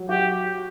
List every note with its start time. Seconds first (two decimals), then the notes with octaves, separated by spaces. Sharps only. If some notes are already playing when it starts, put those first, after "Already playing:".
Already playing: F#3
0.09 F#4 G4